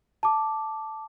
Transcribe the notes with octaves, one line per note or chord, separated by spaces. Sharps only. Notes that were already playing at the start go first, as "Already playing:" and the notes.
A5 D6